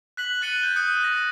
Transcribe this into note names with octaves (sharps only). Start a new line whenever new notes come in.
F#6 B6 F#7
F#6 A6 C#7 D#7 G7
F#6 G6 G7
D#6 F#6 G6 C#7
A#6